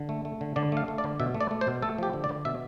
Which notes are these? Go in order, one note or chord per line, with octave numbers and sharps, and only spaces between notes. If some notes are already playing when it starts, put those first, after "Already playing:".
Already playing: D3
A3
A3
D3
D3 D5
A3 F5
A3
D5
D3
B2 E5
A3
D5
A3
C5
B2
A3 A4
F3 G4
D3
D5
D3
B2 E5